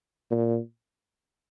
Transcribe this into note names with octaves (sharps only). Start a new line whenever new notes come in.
A#2